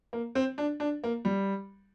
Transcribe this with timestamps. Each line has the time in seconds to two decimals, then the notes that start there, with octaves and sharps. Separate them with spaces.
0.13 A#3
0.35 C4
0.58 D4
0.80 D4
1.04 A#3
1.25 G3